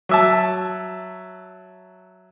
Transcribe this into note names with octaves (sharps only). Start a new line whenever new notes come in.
F#3 E5 A5